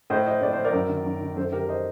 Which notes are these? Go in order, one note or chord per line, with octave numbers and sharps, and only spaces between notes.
A2 C5 D#5
C5 D#5
A2 D5
C5
A#4 D5
F#2
D#3
F#2
D#3
F#2 A4 C5
D#3 G4 A#4
C5 D#5